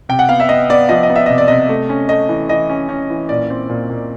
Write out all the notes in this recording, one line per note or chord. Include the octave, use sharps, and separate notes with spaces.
C3 G5
F#5
B3 F5
E5
B3 D#5
B3 D5
F3 D#5
D#5
B3
E5
C3 D#5
D5
C3 D#5
A3
C#4
A3 D#5
E3
E3 D#5
C#4
C#4
E3
A#2 D5
C4
A#2
A#2